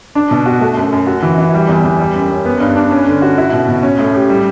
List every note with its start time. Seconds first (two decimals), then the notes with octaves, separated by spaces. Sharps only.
0.15 D4
0.31 B2
0.46 F#4
0.61 A3
0.77 F#2
0.92 F#2
1.07 F#4
1.23 E3
1.38 E3
1.54 G3
1.68 E2
1.84 E2
1.99 G3
2.15 F#2
2.30 C#4
2.45 B3
2.60 G2
2.76 D4
2.91 C#4
3.07 D3
3.22 F#4
3.38 E4
3.53 B2
3.69 B2
3.83 C#4
3.99 A2
4.15 G4
4.30 G3